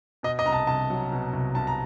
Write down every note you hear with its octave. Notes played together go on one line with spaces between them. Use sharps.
B2 D#5
D#5
C2 A#5
A5
C2 A5
F#3
B2
C2
C2 A5
A#5